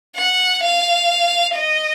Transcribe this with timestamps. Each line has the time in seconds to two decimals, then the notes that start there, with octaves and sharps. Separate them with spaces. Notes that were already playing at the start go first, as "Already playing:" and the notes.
0.17 F#5
0.63 F5
1.56 D#5